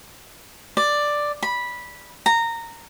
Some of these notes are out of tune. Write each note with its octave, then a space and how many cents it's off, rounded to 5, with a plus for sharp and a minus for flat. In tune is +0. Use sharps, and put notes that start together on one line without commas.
D5 +5
B5 -10
A#5 -15